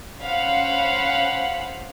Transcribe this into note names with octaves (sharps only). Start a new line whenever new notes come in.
C#4 C5 F5 F#5 B5